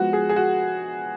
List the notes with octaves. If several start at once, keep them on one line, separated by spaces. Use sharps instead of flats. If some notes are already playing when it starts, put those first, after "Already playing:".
Already playing: F3 G#3 B3 F#4
G#4
G#4
F#4